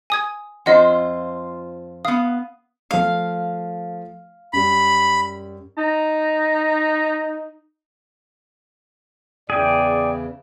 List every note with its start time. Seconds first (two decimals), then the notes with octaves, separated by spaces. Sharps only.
0.10 G#5 D#6 G#6
0.66 F2 F4 C5 D#5 F#5
2.05 B3 F5 D#6
2.91 F3 A3 F5
4.53 F#2 G3 B5
5.77 D#4 A#5
9.50 E2 C#3 E3 G#4 D5 G5